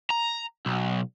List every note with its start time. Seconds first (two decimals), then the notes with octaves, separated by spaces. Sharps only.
0.10 A#5
0.66 B1